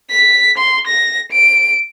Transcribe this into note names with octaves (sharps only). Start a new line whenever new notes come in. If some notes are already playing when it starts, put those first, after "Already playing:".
B6
C6
A#6
D7